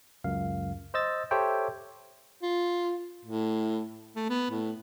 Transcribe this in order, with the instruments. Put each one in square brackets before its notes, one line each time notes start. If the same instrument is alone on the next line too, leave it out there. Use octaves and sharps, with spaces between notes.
[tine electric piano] C#2 F#2 F5
C5 D#5 E6 A6
G4 A4 C5 C#5 E5 G5
[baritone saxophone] F4
A2
A3
B3
A2